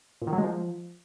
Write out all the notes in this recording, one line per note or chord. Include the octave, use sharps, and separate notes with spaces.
A#2
D#3
F#3
G#3
F3